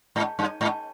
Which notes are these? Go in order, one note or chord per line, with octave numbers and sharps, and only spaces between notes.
G#2
G2
G#2